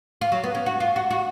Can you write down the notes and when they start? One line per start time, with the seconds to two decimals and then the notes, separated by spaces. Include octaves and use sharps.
0.21 F4
0.32 F#3
0.44 B3
0.55 C#4
0.66 F#4
0.80 F4
0.96 F#4
1.11 F#4